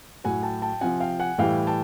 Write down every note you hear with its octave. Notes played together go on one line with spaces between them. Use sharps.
A2 F#3 F#5 G#5
G5 A5
G5 A5
C3 F3 F#5 G#5
F5 G5
F#5 G#5
A2 E3 G3 F5 G5
G5 A5